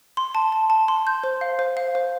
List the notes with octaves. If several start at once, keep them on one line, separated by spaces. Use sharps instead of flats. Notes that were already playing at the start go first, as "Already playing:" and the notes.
C6
A5
A5
A5
C6
G6
C5
F5
C5
F5
C5